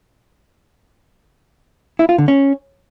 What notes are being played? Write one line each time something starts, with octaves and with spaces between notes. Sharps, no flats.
E4
F4
D3
C#4